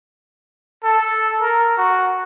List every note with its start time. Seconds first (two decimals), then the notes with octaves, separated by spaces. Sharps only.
0.84 A4
1.41 A#4
1.78 F#4